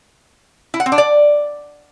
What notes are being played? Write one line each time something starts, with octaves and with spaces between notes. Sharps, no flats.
E4
F#5
C4
D4
D5